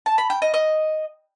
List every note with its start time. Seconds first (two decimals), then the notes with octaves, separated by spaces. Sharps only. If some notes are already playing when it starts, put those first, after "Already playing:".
0.06 A5
0.18 B5
0.30 G5
0.42 D#5
0.54 D#5